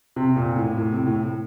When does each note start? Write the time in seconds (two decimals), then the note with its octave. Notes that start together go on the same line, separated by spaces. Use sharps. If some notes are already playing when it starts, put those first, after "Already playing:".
0.16 C3
0.36 A#2
0.56 A2
0.77 A2
0.92 C3
1.07 A2